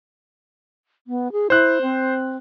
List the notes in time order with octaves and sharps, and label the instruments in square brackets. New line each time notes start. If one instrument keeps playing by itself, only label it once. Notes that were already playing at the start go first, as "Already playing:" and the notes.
[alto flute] B3
G#4
[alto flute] E4 [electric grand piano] C5 F#6
[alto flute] C4